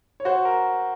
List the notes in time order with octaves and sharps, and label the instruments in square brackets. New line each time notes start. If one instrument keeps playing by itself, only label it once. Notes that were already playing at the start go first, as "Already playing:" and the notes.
[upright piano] C#5
[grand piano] F#4 [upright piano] C5
[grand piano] A#4